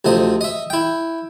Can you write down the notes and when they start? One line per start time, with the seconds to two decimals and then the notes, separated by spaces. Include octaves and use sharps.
0.05 D2 C3 F3 D#5
0.41 D#5 E5
0.70 E4 G5